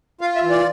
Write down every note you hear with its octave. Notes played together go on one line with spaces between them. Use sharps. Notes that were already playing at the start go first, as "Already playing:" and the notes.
F4 F5
E5
E3
D5